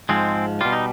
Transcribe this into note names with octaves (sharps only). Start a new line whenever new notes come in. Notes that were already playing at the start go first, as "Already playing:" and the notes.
G#2 F3 G#3 C4
B2 G3 F4
D#4